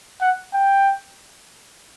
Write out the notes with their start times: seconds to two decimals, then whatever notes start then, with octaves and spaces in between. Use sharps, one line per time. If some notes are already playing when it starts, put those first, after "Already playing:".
0.21 F#5
0.54 G5